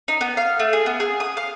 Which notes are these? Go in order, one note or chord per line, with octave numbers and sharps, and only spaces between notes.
D#4
B3
F5
A3
G#4
B3
G#4
D#6
F5